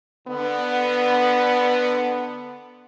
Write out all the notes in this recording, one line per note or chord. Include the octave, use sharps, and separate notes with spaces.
D3 B3